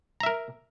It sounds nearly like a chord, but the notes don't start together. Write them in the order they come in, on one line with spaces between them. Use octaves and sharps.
A#5 E5 A#4